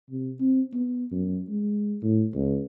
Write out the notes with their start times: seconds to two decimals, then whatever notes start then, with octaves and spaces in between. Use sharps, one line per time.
0.10 C3
0.40 C4
0.74 B3
1.12 F#2
1.49 G#3
2.02 A2
2.34 C#2